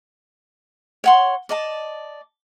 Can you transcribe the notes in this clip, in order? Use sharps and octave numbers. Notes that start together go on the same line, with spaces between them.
C#5 F#5 C6
D5 D#5 A5